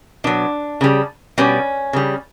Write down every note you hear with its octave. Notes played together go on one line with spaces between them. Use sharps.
B2 F#3 D4
C#3 G3
B2 G3 C#4
C#3 G3